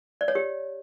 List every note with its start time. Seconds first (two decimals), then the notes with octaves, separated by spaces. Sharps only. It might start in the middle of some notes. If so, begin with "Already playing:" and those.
0.21 D5
0.28 C#5
0.35 G4